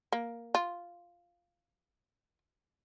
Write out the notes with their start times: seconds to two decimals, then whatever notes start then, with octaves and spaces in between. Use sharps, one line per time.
0.12 A#3
0.55 F4